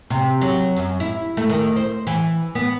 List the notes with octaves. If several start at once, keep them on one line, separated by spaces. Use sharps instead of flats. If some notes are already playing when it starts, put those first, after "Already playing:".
C3
F#3
F#2
E4
A3
D#3
C5
E3
B3